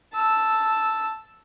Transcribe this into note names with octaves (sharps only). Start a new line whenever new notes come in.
A5 E6